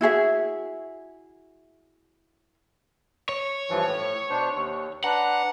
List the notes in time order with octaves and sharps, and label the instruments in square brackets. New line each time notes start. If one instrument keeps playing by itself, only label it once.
[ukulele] E4 F#4 G#4 E5
[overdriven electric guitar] C#5
[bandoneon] G2 E3 F3
A2
B2 D4 C5
D#2
[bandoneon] D4 B4 A#5 [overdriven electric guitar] F#5